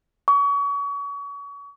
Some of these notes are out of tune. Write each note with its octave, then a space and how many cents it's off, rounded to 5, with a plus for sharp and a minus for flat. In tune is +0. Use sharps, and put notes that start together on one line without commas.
C#6 +35